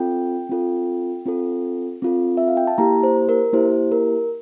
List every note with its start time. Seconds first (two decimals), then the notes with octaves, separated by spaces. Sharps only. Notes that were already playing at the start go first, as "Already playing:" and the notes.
Already playing: C4 F4 A4 G5
0.49 C4 F4 A4
1.26 C4 F4 A4
2.02 C4 F4 A4
2.37 E5
2.48 F5
2.57 G5
2.67 A5
2.78 A#3 E4 G4 A#5
3.03 C5
3.29 A#4
3.53 A#3 E4 G4 C5
3.92 A#4